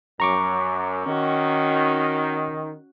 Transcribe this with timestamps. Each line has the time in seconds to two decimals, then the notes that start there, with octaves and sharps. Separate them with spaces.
0.20 F#2 A#5 C#6 D6
1.05 D#3 C#4 F#4